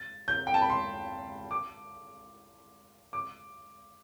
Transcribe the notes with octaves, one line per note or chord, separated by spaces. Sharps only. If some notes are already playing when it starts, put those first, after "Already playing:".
Already playing: A6
G6
G5
A5
B5
C6
D6
D6